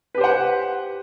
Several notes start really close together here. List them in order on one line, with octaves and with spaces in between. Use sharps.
B4 G4 C5 F#5